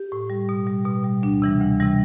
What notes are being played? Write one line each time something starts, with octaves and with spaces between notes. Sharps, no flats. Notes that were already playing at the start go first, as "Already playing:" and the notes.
Already playing: G4
A2
G3
B2
G3
B2
G3
D2 D4
C3 E3 G3
D2
C3 E3 G3